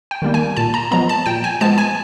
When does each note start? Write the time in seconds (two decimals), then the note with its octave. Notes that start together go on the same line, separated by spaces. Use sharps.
0.11 G5
0.22 D#3 G3 A#3
0.34 G#5
0.57 A#2 A5
0.74 A#5
0.91 F3 G#3 B3 A#5
1.09 A5
1.26 A#2 G5
1.44 G#5
1.61 F3 G#3 B3 A5
1.78 G#5